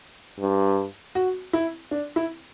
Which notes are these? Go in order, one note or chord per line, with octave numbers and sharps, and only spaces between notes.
G2
F#4
E4
D4
E4